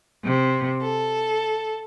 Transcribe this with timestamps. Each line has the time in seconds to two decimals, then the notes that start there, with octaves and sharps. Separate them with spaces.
0.24 C3
0.82 A4